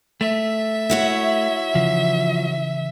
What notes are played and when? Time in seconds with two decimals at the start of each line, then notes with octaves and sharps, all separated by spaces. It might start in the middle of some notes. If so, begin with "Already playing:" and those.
0.21 A3 E5
0.90 E4 F#4 C#5
1.75 C#3 E3 F3